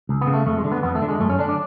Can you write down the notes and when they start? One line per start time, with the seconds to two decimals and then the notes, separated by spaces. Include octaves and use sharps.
0.09 C#2
0.21 B3
0.27 C#3
0.34 A3
0.46 F2 A3
0.58 G#3
0.64 D3
0.72 B3
0.83 F2 B3
0.95 A3
1.02 D3
1.08 G#3
1.20 F#2 A3
1.30 C#4
1.39 D3 D4
1.49 D4